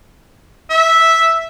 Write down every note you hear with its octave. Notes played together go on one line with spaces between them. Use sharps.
E5